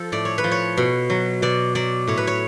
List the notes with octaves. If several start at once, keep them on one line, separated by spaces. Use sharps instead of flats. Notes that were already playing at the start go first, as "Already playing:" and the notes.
Already playing: F3 A4
A2 D5
C#5
B4
F3
C#5
B2
F#3
B2 D5
F#3 D5
A2 C#5
B4
C#5